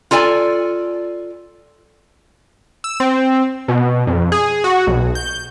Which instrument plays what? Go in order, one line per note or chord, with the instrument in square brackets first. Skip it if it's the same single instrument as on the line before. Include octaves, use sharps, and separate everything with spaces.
[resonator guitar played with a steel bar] F4 A4 D5 G#5
[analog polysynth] E6
C4
B2
F2
G#4
F#4
B1
G6